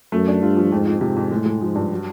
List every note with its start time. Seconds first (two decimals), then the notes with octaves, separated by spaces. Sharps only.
0.12 F#2 A3
0.28 D4
0.42 G2 F4
0.57 F3
0.71 F2 G#2
0.87 F2
1.01 G#2 C3
1.16 F2
1.31 A2 G#3
1.46 G#3
1.61 G#2 F3
1.75 G2
1.92 F#3